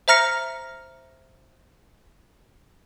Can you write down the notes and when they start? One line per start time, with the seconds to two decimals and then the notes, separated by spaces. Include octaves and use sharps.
0.08 C5 E5 A#5 F6 A#6 C#7